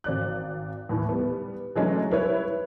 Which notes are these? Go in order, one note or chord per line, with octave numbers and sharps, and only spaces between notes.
G#1 D5 F#6
D#2 A2 E3
G3 B3
E3 F#3 G#3 A3 C#4 D4
G3 E4 B4 C#5